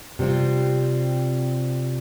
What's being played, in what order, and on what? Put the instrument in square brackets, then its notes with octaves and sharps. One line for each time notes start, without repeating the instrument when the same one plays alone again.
[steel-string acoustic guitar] C3 G3 C4 F4